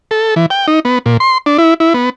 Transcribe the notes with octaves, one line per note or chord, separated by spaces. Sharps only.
A4
E3
G5
D#4
B3
A#2
C6
D4
E4
E4
B3